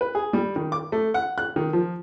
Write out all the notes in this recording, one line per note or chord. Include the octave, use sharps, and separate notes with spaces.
B4
G#4
G3
D#3
D6
A3
F#5
F#6
D#3
F3